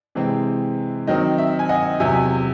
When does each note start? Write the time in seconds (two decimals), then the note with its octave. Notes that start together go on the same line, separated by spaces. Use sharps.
0.15 C3 E3 G#3 C4
1.07 D#3 F#3 C4 D#5
1.38 E5
1.59 G#5
1.69 D#5 F#5
2.00 E2 C3 F#3 E5 G#5